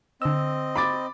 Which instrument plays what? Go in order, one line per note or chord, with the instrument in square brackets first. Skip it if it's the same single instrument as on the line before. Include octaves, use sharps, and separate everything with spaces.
[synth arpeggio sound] D3 E6 [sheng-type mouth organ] C4 D#5
[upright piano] B5 D6 A6